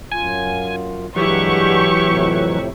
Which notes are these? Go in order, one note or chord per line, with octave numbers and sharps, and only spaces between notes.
F#2 F4 G#5
G2 D3 E3 F#3 G#3 E4 G4 C#6
F2 A2 C3